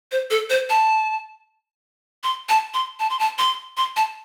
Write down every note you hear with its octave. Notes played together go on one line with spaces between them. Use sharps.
C5
A4
C5
A5
C6
A5
C6
A5
C6
A5
C6
C6
A5